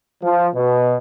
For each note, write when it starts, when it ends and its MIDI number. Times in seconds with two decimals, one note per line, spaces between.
0.23 0.48 53
0.55 0.97 47